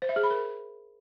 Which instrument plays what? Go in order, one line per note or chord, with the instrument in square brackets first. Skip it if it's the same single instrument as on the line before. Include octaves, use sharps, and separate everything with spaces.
[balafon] C5
E5
G#4
B5
A#4